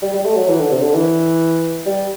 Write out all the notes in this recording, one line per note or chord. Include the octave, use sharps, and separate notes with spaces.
G3
G3
A3
F#3
E3
D3
C3
D3
E3
G3